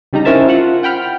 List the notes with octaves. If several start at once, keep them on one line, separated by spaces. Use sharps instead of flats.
C#3 G3 D#4 A#5
C#4 E4 A#4 C5 E5 A5
F4 F#5
F#5 G5 B5 F6